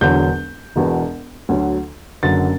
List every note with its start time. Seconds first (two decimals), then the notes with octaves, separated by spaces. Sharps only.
0.01 E1 E2 D3 F#3 G6
0.76 E1 E2 B2
1.49 D2 D3 F#3
2.23 F#1 F#2 D3 F#3 A6